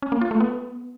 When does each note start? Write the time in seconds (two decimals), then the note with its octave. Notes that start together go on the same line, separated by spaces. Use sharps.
0.02 C#4
0.12 A#3
0.21 F4
0.31 A3
0.40 B3